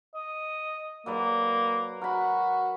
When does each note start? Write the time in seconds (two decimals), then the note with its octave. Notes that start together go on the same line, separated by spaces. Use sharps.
0.14 D#5
1.06 F#3 A#3 B4 D5
2.02 F#4 A#4 B5